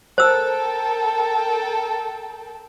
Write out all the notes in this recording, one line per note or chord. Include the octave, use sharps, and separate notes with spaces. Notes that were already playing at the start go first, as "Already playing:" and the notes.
A4 A#4 C5 G5 E6